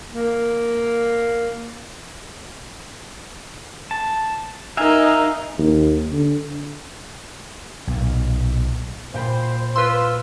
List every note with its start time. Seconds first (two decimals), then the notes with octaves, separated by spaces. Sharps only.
0.13 A#3
3.91 A5
4.77 D#4 A#4 E5 F5 G#5
5.58 D#2
6.12 D3
7.87 B1 A#2
9.14 A#2 C5 G5 B5
9.76 F4 B4 C6 E6